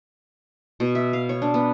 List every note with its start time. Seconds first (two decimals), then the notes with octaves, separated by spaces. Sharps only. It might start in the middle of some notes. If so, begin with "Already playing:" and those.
0.80 B2
0.95 E5
1.13 F5
1.29 C#5
1.42 D4
1.54 B3